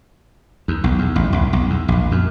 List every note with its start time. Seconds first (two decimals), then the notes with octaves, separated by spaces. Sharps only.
0.68 D#2
0.84 B1
0.99 E2
1.16 A1
1.32 C2
1.53 B1
1.70 E2
1.88 A#1
2.12 F#2